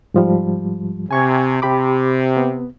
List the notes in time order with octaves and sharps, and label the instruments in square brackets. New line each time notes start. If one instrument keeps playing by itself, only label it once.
[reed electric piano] G#2 F3 G3
[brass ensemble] C3 [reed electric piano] G#5 C#6 G#6
[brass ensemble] C3 [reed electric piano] G4 B5 D6
[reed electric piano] B3